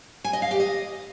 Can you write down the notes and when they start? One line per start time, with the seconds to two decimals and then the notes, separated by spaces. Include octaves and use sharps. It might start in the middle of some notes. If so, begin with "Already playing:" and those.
0.24 G#5
0.33 D#5
0.42 F5
0.51 G4
0.60 D#5